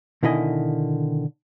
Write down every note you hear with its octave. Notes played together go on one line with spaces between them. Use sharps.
B2 D3 D#3 E4 D#5 G#5